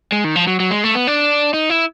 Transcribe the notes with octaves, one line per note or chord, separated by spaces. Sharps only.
G#3
D#3
F3
F#3
F#3
G#3
A3
B3
D4
D#4
E4